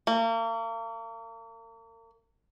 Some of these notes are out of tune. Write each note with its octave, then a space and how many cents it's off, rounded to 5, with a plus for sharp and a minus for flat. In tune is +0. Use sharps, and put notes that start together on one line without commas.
A#3 -40